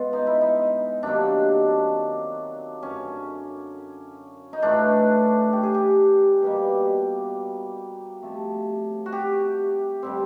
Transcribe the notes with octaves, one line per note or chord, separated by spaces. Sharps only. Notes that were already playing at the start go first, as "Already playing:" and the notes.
Already playing: G#3 B3 F4
D#4
E4
D#4
C3 D#3 F#3 A#3 D4
F#2 D3 F#3 C#4
D#4
A2 E3 A3 D4
G4
G#4
G4
B2 G3 A#3
C3 F3 A3
F#4
G4
D3 G3 C4